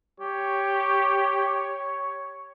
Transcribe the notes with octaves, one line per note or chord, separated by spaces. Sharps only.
G4 C#5